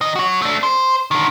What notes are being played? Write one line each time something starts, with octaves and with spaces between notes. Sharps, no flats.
D#3 D#5
F#4 C#5
A3 D4
C5
D3 D#3